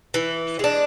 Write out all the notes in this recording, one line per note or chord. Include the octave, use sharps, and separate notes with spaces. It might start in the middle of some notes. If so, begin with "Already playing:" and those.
E3
G#3 D4